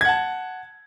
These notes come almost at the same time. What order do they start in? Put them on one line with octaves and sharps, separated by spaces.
G#6 F#5 A5